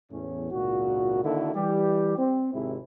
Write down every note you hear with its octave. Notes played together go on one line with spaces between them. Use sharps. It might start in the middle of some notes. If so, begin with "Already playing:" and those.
E2 A2 C#4
G#1 C#2 A#2 F#4
D3 D#3 A#3 E4 F#4 A4
E3 G3 G4
C4
G#1 C3 G#3 E4